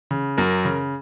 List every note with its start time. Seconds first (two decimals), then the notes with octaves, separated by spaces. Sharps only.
0.11 C#3
0.37 F#2 A#4
0.65 C#3